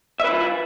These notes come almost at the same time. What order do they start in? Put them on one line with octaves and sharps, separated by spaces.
E5 B4 E4 F4